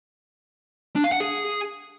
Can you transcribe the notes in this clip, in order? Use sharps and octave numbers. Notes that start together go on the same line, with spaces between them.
D4
F5
F#5
G#4